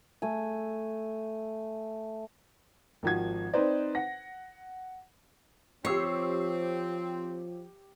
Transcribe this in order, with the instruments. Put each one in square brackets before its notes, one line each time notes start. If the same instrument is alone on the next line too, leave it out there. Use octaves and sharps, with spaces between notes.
[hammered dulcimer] A3 G#5
[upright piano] G#1 D#3 F3 F#4 G#6
C4 D#4 B4 C5 D5
F#5 A#6
[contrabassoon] F3 [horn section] C4 [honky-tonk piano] G4 E6 C7 [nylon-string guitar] C#5